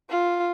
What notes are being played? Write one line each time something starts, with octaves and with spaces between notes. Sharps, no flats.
F4